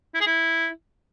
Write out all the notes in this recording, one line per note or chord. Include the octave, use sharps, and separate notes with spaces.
E4
G#4
E4